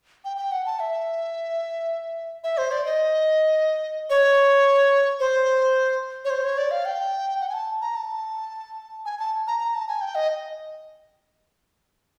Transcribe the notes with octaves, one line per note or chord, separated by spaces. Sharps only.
G5
G5
F#5
A5
E5
E5
C5
D5
D#5
C#5
C5
C#5
C5
C#5
D5
F5
G5
F#5
G#5
A5
A#5
A5
G#5
A5
A#5
A#5
A5
G#5
G5
D#5